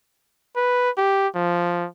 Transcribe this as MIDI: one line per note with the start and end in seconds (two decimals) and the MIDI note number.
0.56 0.90 71
0.98 1.28 67
1.35 1.86 53